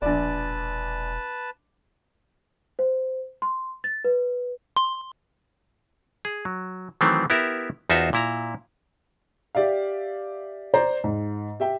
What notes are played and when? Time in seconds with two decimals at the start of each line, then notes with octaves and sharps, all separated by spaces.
0.02 E1 A#1 B4 D5 A5
2.79 C5
3.42 C6
3.84 A6
4.04 B4
4.77 C6
6.25 G#4
6.45 F#3
7.01 D#3 E3 F#3 A3 C4
7.30 B3 E4 G4 A#4 E5
7.90 E2 D#4 F4 F#4 C5 E5
8.13 A#2 E4 A#5
9.55 G4 D5 E5 F5
10.74 C5 D5 A#5
11.04 G#2
11.60 G4 E5 G5